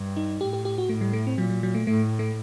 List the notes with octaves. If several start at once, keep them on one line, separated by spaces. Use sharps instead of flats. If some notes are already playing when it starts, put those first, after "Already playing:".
Already playing: G2
D#4
A2 G4
G4
G4
F#4
A2 A3
G3
A3
C4
A#2 F#3
F#3
F#3
A3
A2 A3
A3